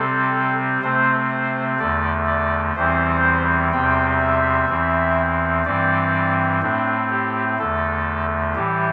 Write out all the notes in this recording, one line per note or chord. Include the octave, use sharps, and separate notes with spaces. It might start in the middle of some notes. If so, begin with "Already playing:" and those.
Already playing: C3 G3 C4 A4
C3 A3 C4 C5
C5
E2 D3 A3 D5
D5
E2 E3 G3 C4 C5
E2 C3 G3 C4 G5
E5
E2 E3 C4
G2 E3 G3 C4 D5
A2 A3 C4 D4
G4
E2 D3 A3 A4
A2 E3 G3 G4